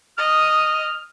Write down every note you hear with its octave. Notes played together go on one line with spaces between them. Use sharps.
D#5 F6